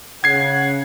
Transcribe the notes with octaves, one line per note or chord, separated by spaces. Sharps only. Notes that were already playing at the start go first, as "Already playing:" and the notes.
C#3 F#5 G#6 C7